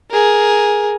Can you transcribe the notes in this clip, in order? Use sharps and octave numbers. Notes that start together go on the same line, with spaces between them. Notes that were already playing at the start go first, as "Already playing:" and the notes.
G#4 A#4